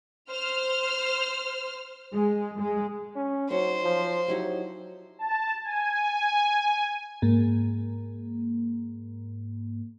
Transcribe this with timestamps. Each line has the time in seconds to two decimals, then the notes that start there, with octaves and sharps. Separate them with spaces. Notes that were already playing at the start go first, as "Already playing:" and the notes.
0.29 C5 F6
2.12 G#3
2.58 G#3
3.16 C#4
3.51 F#3 D#4 C5 C#5
3.83 F3
4.28 F#3 D#4 E4 G4
5.19 A5
5.64 G#5
7.22 G#2 A#3